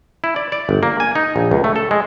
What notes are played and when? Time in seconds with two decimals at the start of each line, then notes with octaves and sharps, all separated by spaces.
0.24 E4
0.36 D5
0.52 D5
0.69 G1
0.83 A#3
1.00 G#5
1.15 D#4
1.36 A#1
1.51 C#2
1.64 A3
1.76 A4
1.91 G#3